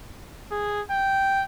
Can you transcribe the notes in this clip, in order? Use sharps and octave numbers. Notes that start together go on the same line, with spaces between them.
G#4
G5